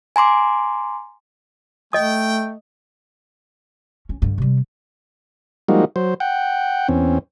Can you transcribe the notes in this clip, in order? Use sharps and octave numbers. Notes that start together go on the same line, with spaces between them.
G#5 A#5 C6 D6
A3 D#5 G5 D#6
C#4
G2 D3
C3 G3
F3 G3 G#3 A#3 D#4 F#4
F#3 C5
F#5 G5
E2 C4 C#4